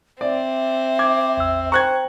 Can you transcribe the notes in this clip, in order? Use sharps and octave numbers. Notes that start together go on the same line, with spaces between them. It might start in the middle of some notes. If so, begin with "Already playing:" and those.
C4 D5 E5
D6 G#6
A1 E2 E6
C5 G5 A#5 C#6 F#6 G#6